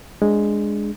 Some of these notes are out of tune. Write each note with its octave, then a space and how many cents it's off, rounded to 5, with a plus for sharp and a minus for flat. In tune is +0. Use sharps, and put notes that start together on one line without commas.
G#3 +0 D4 +0